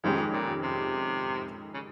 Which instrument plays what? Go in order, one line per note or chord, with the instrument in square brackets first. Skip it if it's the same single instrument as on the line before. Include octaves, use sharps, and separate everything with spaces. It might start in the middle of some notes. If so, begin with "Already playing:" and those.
[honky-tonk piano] F2 D#3 G#3 C#4 G4 [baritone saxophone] G#2
[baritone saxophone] A#2
C3
C#3